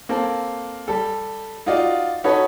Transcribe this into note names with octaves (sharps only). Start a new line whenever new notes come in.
A#3 C4 A4
G3 A4
D#4 F4 F#4 D5 D#5 F5
C#4 D#4 F#4 A4 B4 C#5